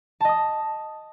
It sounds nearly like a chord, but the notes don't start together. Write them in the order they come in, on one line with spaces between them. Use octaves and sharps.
A5 D#5 D#6